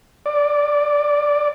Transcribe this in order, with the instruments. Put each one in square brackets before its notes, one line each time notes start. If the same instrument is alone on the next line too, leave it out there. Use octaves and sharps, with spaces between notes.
[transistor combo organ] D5